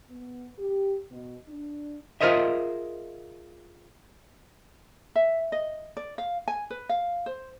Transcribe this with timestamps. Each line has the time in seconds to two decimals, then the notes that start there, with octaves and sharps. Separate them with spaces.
0.10 B3
0.58 G4
1.11 B2
1.48 D4
2.21 F4 G#4 A#4 C5 D#5 E5
5.15 E5
5.52 D#5
5.97 D5
6.18 F5
6.48 G#5
6.70 B4
6.89 F5
7.26 C5